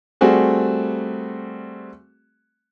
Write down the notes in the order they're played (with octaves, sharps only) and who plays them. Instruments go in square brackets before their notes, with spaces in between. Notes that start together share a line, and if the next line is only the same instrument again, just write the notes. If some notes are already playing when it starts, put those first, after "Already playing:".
[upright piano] G3 A3 C4 F#4 G#4